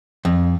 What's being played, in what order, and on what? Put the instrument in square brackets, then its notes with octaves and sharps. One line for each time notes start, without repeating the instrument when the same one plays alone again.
[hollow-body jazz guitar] F2